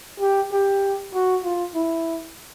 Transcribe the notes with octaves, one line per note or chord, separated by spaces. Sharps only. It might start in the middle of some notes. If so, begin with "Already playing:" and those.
G4
G4
F#4
F4
E4